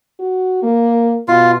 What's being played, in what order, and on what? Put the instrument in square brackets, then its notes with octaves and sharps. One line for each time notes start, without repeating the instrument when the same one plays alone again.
[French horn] F#4
A#3
[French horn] B2 [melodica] F4